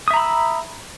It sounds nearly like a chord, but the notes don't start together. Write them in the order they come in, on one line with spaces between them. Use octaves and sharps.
D#6 E5 A#5 B5 E6